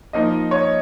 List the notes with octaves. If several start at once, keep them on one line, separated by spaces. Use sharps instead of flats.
F3 A#3 D#4 D#5
C#5